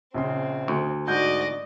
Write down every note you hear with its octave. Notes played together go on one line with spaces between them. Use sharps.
A#1 C#3 C4 C6
D2
G#2 F#4 D5 D#5 G6